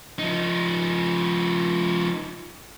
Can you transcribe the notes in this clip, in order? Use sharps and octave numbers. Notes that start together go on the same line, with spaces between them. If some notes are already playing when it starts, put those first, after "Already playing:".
F3 D#4